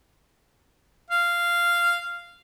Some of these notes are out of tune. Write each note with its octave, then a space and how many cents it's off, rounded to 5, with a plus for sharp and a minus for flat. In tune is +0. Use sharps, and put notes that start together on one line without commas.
F5 -10